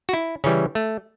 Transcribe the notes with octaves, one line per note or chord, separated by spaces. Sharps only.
F#4
E4
C#3 E3 G3 C#4
A3